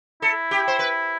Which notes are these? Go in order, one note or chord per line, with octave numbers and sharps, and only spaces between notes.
E4 A4
G4
C5
B4